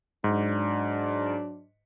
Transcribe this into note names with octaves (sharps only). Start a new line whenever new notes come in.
G#2 F#3 D4